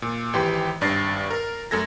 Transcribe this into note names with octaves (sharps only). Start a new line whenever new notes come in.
A#2
G#1 E3 G4 G5 C6
G#1 G2 D5 A6 A#6 C7
A#4
F#2 A3 A4 G#6 A#6